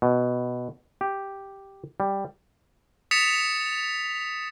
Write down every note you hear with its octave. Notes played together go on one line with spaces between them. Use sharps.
B2
G4
G3
D#6 A6 B6 C#7 E7 F7